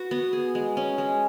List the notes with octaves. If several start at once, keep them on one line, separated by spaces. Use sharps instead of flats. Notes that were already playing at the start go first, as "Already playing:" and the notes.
Already playing: F#4 B4
B3
G#4
G#3
C#4
G#3